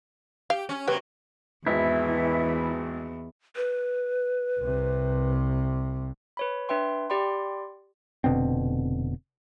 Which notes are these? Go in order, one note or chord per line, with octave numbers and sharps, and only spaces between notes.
G4 F5
C#4
C3 F#3 A#3 G4 B4 G5
G#1 E2 E3 E4
B4
C2 C3
B4 C#5 B5
D4 B4 E5 G5 C6
G4 D5 G5 B5 C6
F1 B2 D3 C4